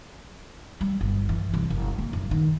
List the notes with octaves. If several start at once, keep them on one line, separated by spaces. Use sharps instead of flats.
G3
G1
E3
C2
F#1
A#3
F#1
D#3